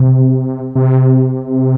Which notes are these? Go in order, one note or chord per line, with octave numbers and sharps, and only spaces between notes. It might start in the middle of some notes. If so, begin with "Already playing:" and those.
Already playing: C3
C3